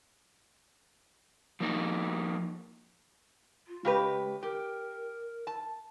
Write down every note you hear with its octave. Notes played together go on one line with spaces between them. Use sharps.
F3 A#3 D#4
F4
C#3 G#3 G4 B4
G4 A#4
A5